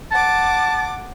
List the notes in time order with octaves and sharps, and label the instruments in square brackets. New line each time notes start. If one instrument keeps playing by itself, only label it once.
[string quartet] F#5 D6 [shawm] A5